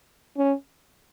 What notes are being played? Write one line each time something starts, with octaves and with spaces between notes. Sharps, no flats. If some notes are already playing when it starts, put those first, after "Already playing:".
C#4